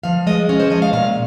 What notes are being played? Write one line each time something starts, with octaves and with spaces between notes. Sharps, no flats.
F3 F5
G#3 D#5
C#4 C#5
C5
F3 D#5
F5
A#2 F5